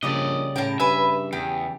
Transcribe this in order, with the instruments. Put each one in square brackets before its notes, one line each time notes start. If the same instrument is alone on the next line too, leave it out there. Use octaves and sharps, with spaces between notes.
[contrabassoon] A#1 [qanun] C#3 G3 A4 [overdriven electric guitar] D5 D#5
[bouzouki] A2 G5 [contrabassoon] C#3 [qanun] A#4 A5 A#5
[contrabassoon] G2 [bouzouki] B4 G#5 [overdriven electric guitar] E5
[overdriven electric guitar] E2 [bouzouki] G4